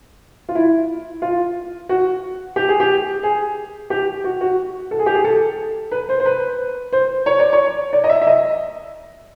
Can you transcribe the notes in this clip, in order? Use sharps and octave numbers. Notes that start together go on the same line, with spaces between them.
F4
E4
F4
F#4
G4
G#4
G4
G#4
G4
F#4
F#4
A4
G#4
G4
G#4
A4
B4
C5
C5
B4
C5
C#5
D5
C#5
D5
D#5
E5
E5
D#5